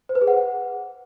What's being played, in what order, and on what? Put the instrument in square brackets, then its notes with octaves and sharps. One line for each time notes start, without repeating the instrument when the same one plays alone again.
[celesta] C5
B4
G#4
F#5